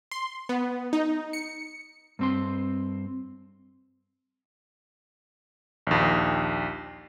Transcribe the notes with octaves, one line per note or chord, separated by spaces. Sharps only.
C6
B3
D#4
C#7
G2 C4 C6
A#1 D#2